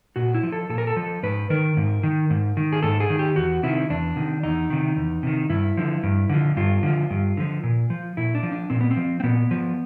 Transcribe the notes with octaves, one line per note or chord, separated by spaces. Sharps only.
A#2 F#4
E4
F3
A4
A#2 A4
A#4
A4
F3
G#2 B4
D#3 A#4
G#2
D#3
G#2
D#3
G#4
G#2 A4
G#4
D#3
G4
E2 F#4
C3 D#3 E4
E2 D4
C3 D#3
E2 D#4
C3 D#3
E2
C3 D#3
G2 E4
D3 F3
G2
D3 F3
G2 F4
D3 F3
G2
D3 F3
A#2
F3
A#2 E4
D4
F3
D4
A#2 C4
B3
C4
F3
C4
A#2 B3
F3